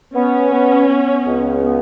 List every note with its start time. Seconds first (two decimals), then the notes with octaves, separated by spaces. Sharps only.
0.15 B3 C#4
0.53 B3
0.89 B3
1.27 C#2
1.63 B3